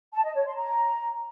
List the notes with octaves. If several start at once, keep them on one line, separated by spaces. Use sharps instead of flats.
A5
D#5
C#5
C6
A#5